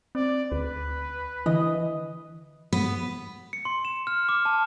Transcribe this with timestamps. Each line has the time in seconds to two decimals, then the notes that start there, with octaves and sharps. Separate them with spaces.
0.15 C4 D5
0.52 D2 B4
1.46 D3 E3 D#5
2.73 B3
3.53 C#7
3.65 C6
3.85 E7
4.07 F6
4.29 D6
4.45 A5